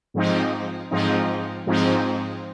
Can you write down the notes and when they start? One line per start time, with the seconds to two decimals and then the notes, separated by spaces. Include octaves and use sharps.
0.14 G#2 F3 C4 D#4
0.91 G#2 F3 C4 D#4
1.66 G#2 F3 C4 D#4